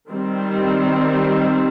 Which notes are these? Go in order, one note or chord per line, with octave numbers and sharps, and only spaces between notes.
D#3 G3 C4